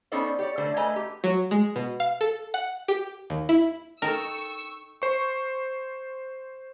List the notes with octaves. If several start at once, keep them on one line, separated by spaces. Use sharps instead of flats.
B3 C#4 D#4 A4 C5 D5
G4 C#5 D5
D3 A3 C5
A3 B4 D#5 G#5 A#5
G4
F#3
G#3
B2
F5
A4
F#5
G4
D#2
E4
D#4 A4 A#4 G5 C#6 E6
C5 C#6